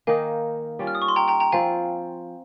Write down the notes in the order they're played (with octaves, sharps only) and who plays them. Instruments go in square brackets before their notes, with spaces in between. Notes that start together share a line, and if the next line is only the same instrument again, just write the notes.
[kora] D#3 A#3 D#4 [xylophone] F5 G#5
[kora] G3 C#4 F4
[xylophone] F6
D#6
C#6
C6
G5 A#5
G5 A#5
G5 A#5
[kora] F3 C4 F4 [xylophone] F5 G#5